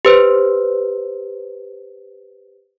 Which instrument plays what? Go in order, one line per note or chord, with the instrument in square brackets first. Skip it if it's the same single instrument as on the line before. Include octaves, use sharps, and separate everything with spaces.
[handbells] G4 B4 C5